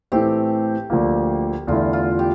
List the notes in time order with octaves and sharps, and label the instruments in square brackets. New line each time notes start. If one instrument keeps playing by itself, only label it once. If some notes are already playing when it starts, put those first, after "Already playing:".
[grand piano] A2 E3 A3 C4 [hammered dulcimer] G4
[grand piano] D2 D3 F3 A#3
[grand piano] E2 D3 A3 E4 [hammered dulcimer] F4
[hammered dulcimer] F4
G4